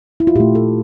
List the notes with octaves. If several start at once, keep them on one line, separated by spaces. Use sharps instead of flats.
E4
F4
A#2 A3 G4
A4